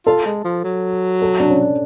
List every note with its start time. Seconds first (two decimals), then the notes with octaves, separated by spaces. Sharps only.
0.06 F4 A4
0.25 G#3
0.44 F3
0.64 F#3
1.22 A4
1.40 D4
1.51 C#4